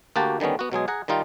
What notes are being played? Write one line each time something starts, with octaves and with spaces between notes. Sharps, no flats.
D2 A#3 F#4 G4 A5
D3 D#3 G3 B3 C#4
B3 F#4
B2 F#3 G#3 G#4
G#4 F#5 A#5
D#3 G3 D#4 F4